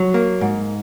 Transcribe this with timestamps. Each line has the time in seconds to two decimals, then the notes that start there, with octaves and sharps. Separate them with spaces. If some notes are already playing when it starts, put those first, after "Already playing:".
Already playing: F#3
0.14 A#3
0.41 G#2